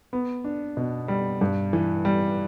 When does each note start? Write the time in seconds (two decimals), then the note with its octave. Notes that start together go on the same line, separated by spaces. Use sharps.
0.13 B3
0.44 D4
0.77 B2
1.08 G3
1.41 G2
1.73 E3
2.05 G3